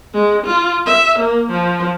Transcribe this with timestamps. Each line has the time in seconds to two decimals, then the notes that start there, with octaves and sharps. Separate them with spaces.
0.14 G#3
0.46 F4
0.86 E5
1.19 A#3
1.51 F3